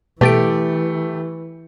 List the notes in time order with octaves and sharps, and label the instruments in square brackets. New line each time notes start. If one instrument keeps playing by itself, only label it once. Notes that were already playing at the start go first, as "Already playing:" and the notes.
[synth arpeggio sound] B2 A4 D7 [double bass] E3 [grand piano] A3 G4